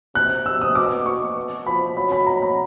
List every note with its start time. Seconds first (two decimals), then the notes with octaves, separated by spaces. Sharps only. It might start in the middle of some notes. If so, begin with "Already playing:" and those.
0.15 C3 F#6
0.46 E6
0.62 D#6
0.75 B2 D6
1.06 B2 C#6
1.66 F3 B5
1.97 F#3 B5
2.12 B5
2.27 A#5
2.42 B5